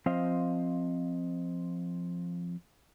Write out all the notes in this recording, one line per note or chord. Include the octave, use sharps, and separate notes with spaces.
F3 C4 C5 D#5 F5